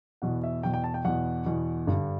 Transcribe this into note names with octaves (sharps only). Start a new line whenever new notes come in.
E2 B2 F#5
E5
E2 B2 G5
G5
A5
G5
E2 B2 F#5
E2 B2
G2 D3